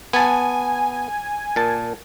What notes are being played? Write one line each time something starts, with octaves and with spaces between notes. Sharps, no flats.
B3 G#5 A5
A#2 A5